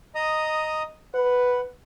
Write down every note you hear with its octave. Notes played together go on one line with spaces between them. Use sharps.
D#5 A#5 D#6
B4 F#5